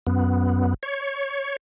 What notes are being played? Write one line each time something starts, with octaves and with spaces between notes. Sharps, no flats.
F#2 B3
C#5